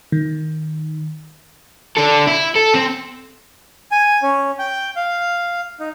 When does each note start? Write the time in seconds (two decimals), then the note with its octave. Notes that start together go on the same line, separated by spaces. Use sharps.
0.12 D#3
1.97 D4 A4
2.28 E4
2.56 A4
2.74 C4
3.91 G#5
4.22 C#4
4.59 G5
4.96 F5
5.80 D#4